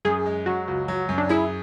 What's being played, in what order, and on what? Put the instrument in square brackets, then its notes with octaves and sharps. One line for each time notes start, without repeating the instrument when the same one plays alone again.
[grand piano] F#2 [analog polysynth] G#4
[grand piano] G#3
[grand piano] F#3 [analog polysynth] F#4
[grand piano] C#2
F#3
F#2
[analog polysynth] D4
[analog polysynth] E4 [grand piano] G#4